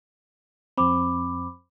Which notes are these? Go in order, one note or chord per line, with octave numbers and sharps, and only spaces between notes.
F2 C4 B5 D6